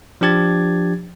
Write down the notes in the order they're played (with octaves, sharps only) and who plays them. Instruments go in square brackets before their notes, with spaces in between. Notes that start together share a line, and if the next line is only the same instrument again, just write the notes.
[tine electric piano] F3 D4 G4 G#6 A6